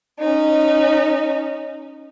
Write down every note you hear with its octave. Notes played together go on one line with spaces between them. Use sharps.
C#4 D#4